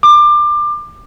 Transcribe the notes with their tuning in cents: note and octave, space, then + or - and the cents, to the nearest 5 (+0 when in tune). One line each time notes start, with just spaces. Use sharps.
D6 +25